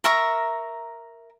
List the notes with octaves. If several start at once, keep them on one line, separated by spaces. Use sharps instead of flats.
A#4 E5 A#5 C#6